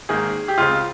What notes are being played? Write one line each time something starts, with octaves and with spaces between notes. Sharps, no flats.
G#1 G#2 D#3 A#3 G#4
G4
C#2 C#3 G#3 C4 F4